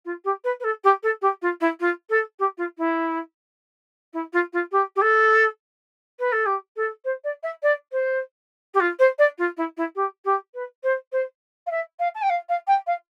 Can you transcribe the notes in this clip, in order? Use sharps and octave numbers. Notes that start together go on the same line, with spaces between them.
F4
G4
B4
B4
A4
G4
A4
G4
F4
E4
F4
A4
G4
F4
E4
E4
F4
F4
G4
G4
A4
B4
A4
G4
A4
C5
D5
E5
D5
C5
G4
F4
C5
D5
F4
E4
E4
G4
G4
B4
C5
C5
F5
E5
F5
A5
G5
F5
F5
G5
F5